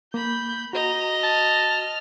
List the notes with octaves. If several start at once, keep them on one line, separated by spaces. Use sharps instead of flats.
A#3 B5 G6
F#4 D#5 A#5
A5 F6